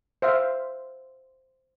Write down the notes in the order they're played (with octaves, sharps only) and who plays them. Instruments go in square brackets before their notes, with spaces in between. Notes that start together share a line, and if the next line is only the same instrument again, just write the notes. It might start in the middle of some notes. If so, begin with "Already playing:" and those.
[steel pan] C5 E5 F5